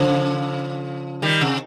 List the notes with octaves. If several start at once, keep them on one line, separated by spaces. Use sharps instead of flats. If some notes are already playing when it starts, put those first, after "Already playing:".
Already playing: C#3 F3
D#3 G3
C3